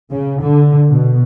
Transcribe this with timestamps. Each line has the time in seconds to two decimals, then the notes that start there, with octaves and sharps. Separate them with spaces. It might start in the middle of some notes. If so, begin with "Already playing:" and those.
0.10 C#3
0.42 D3
0.91 B2